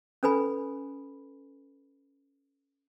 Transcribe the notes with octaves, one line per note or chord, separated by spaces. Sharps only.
C#4 A4 B4 G#5 B5